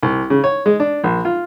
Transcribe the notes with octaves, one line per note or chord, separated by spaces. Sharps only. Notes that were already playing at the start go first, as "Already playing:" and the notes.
C2
C#3
C#5
G#3
D4
A#1
F4